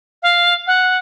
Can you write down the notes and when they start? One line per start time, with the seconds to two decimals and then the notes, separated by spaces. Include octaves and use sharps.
0.23 F5
0.67 F#5